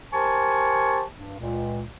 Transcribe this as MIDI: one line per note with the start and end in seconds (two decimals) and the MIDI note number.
0.12 1.03 67
0.12 1.03 70
0.12 1.03 72
0.12 1.03 80
0.12 1.03 81
0.12 1.03 85
1.14 1.36 43
1.38 1.84 37
1.38 1.84 46